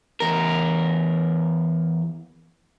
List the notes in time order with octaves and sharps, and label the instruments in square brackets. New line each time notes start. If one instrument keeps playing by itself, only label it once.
[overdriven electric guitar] E2 A#4